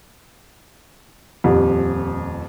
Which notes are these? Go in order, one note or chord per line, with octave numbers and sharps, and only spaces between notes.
D#1 F2